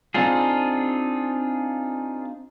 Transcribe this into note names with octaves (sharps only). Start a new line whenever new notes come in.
C4 D4 D#4 F4 G#4